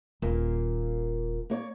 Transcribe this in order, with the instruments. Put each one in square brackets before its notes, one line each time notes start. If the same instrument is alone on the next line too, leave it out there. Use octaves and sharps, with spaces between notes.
[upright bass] D#1 [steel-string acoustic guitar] A#2 A#3
[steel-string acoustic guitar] A#3 C#5 D5